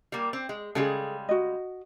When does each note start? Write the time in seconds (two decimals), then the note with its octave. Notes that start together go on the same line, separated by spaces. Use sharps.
0.12 G3 A#3
0.33 C4
0.49 G#3
0.75 C#3 G3 G#3 G#4 A4
1.29 F#4 D#5